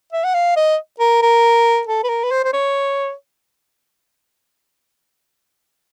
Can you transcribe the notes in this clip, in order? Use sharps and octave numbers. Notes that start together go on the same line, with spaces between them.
E5
F#5
F5
D#5
A#4
A#4
A4
B4
A#4
B4
C5
C5
C#5